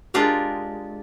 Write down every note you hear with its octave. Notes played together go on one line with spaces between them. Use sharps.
G#3 D4 F4 G4 A#4